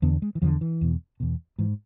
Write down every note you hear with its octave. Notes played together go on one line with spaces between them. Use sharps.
E2 D3 B3
G#3
E3
E2 D3 F3
E3
E2 B2
E2 B2
G#2 E3